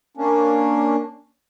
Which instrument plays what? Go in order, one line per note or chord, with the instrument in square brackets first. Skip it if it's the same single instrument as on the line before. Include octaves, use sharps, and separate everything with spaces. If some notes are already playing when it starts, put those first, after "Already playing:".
[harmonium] A#3 C#4 D4